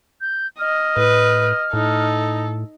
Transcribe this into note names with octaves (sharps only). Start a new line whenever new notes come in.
G6
D#5 F6
A2 B4
A2 D#4 A4